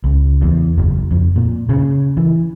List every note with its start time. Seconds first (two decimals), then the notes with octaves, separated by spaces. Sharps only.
0.04 C#2
0.42 E2
0.78 F#1
1.11 F2
1.36 A#2
1.69 C#3
2.17 E3